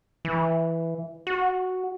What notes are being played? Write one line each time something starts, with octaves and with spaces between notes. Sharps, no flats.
E3
F#4